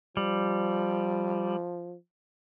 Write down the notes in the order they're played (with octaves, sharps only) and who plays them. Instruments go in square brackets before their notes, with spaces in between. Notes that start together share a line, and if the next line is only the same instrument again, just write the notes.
[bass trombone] F3 [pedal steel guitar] G3